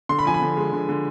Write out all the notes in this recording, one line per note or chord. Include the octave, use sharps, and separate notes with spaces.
D3 C6
B5
F3 G#5
B5
D3
G#3
D3
D3